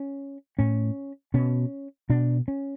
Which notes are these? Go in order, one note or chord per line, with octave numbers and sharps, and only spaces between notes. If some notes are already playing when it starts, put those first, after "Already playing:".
Already playing: C#4
A2 C#4
B2 C#4
B2 D4
C#4